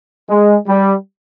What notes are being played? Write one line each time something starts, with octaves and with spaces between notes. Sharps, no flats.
G#3
G3